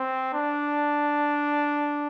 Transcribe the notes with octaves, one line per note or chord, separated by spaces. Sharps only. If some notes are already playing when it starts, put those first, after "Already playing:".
Already playing: C4
D4